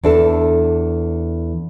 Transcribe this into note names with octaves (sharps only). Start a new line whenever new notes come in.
E2 D4 A4